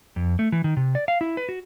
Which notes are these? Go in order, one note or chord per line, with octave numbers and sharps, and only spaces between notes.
F2
A3
E3
D#3
C3
D5
F5
E4
B4
F#4